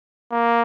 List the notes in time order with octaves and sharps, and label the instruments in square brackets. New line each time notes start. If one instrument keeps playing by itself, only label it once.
[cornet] A#3